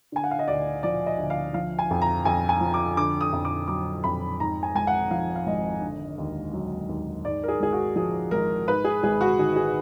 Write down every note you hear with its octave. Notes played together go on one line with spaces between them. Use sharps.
D3 G#5
F#5
F5
D#5
D2 D5
F3 D5
D#5
D2
F5
F3 F5
G#5
F2
A#5
F2 G#5
G#5
F3
D6
D3 D6
D#6
F2
D6
F#3 D6
F2 B5
G#2 A#5
G#5
G#1 G#5
F#5
F3 F5
F5
G#1 D#5
D3
D#2
F#3
D#2
G#2 D5
A#4
G#4
G#1 G#4
F#4
F3 G#4
G#1 A#4
G#2 B4
G#4
G#1 G#4
F#4
D#3 G#4
G#4